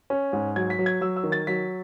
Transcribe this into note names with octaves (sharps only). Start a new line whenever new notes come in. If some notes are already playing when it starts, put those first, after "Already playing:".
C#4
G#2
F#3 G#6
B6
F#3
G#6
F#3 E6
E6
D#3
A6
F#3 B6